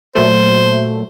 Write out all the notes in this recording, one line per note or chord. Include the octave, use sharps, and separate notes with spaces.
A#2 F#3 A3 C5